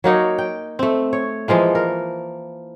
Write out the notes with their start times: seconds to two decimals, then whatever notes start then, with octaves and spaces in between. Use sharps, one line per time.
0.04 F#3 A#3 D#4 C#5
0.38 G5
0.79 A3 C4
1.13 C#5
1.48 E3 F3 G#3 A#3
1.75 A#4